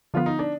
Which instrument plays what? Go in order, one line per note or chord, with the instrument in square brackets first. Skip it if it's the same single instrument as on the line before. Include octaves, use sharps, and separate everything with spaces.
[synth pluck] D3 F3 B3 [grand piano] F4
[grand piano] D#4
D4